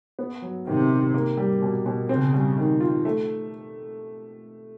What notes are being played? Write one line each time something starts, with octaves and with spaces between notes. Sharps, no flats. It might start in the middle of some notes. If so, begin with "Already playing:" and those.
B3
F#3
C3 D#3
D#3
A#3
G3
B2
B2
C#3 C4
G3
D#3
F4
A3